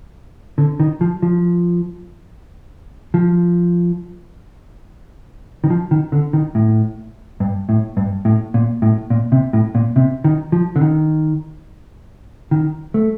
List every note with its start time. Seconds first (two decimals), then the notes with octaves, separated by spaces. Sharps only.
0.58 D3
0.80 D#3
1.01 F3
1.22 F3
3.14 F3
5.64 D#3
5.70 F3
5.91 D#3
6.12 D3
6.33 D#3
6.55 A2
7.40 G2
7.69 A2
7.97 G2
8.25 A2
8.54 A#2
8.82 A2
9.10 A#2
9.32 C3
9.53 A2
9.75 A#2
9.96 C3
10.24 D#3
10.52 F3
10.76 D3
10.81 D#3
12.51 D#3
12.94 A3